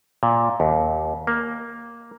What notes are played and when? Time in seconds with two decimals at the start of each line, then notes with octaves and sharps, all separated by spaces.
0.23 A#2
0.60 D#2
1.27 A#3